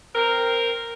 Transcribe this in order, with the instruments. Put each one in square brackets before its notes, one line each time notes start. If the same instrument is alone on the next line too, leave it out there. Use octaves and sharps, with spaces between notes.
[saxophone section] C4 A#4